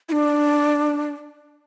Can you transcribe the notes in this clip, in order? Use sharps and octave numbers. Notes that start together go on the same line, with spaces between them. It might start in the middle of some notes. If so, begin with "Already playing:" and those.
E4
D4